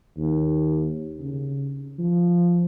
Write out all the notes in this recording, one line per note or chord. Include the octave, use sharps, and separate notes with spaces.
D#2
C#3
F3